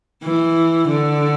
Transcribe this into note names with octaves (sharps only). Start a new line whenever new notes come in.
E3
D3